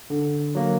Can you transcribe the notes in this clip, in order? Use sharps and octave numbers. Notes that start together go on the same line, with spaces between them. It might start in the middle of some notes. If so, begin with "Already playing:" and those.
D3
F#3 A#3